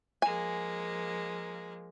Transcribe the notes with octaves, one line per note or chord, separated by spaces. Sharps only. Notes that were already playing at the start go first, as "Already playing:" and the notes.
F3 G#3 A#3 G#5